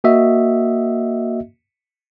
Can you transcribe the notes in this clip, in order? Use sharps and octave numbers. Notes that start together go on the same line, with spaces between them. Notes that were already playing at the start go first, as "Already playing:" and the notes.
A#3 F#4 D#5 E5